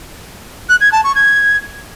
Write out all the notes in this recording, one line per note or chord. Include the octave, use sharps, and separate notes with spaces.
F#6
G#6
A5
C#6
G#6